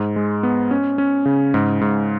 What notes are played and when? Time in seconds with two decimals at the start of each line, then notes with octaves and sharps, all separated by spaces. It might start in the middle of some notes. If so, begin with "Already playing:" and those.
Already playing: G#2
0.16 G#3
0.43 B3
0.71 C#4
0.98 C#4
1.25 C#3
1.54 G#2
1.81 G#2